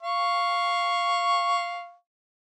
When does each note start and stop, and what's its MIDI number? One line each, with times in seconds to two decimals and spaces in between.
0.03 1.94 77
0.03 1.94 85